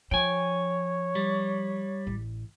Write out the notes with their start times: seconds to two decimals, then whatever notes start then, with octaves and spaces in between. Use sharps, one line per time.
0.11 F3 C#5 G5 G#5
1.15 G3
2.07 A1